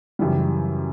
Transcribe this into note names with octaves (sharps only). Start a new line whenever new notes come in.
F#2 C#3 E3 G3